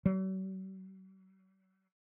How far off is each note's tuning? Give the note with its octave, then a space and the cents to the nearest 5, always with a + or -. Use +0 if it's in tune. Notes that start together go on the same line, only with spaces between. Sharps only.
F#3 +45